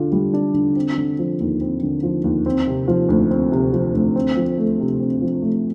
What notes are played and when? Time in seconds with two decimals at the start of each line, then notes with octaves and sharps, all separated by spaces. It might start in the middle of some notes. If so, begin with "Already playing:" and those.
Already playing: D3 D4 F4
0.12 G3
0.33 D4
0.54 D3
0.76 C4
0.98 D3
1.19 F3
1.40 D#2
1.61 C4
1.82 D3
2.03 F3
2.24 D#2
2.46 C4
2.67 C3
2.88 F3
3.09 D2
3.31 C4
3.52 C3
3.73 F3
3.94 D2
4.16 C4
4.36 F3
4.58 A3
4.80 C3
5.00 C4
5.22 F3
5.42 A3